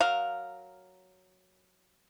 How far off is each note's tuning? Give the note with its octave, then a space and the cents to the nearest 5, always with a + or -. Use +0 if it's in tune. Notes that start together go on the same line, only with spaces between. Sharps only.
F#3 +0 A#4 -5 F5 +0